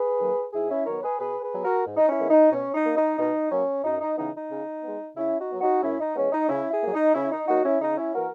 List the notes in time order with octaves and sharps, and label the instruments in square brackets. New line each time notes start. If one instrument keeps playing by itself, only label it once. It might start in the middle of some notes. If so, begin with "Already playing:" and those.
Already playing: [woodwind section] G#4 B4
D#3 F#3 A#3
G#2 E4 G#4
C#4 E4
D#3 F#3 B3 A#4 C#5
G#4 B4
B2 G#4 B4
G#4 B4
F#3 B3
F#4 A#4
G#2
D#4
C#4 E4
D#3 G#3 B3
D#4
B2 C#4
D#4
A#3
D#4
B2 D#4
F#3 A#3 C#4
F#2 D#4
D#4
C#3 E3 B3 D#4
D#4
C#3
G#3 B3
C#3 C#4 E4
D#4 F#4
F#3 B3
D#4 F#4
F#2 C#4 E4
D#4
E3 G#3 B3 C#4
D#4
C#3 C#4 E4
E4 G#4
A#3
F#3
D#4
C#3 C#4 E4
D#4
F#3 A#3 D#4 F#4
C#4 E4
C#3 D#4
C#4 E4
E3 A#3 F#4 A#4